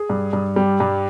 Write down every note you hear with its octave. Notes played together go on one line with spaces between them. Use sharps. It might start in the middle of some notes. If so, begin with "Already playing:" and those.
Already playing: G#4
G2
G2
G3
G2